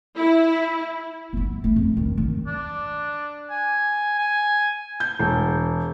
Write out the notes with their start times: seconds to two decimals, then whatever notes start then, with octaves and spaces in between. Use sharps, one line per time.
0.17 E4
1.33 B3 D#4
1.64 A3
1.76 F2
1.97 D#3 D4
2.18 D#3
2.47 D4
3.50 G#5
4.18 G#5
5.00 G6
5.19 E1